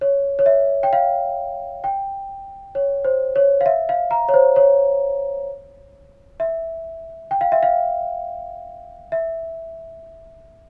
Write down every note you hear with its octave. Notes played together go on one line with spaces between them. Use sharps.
C#5
C#5
E5
G5
F5
G5
C#5
C5
C#5
F5
E5
F5
A#5
C#5
C5
C#5
E5
G5
F5
E5
F5
E5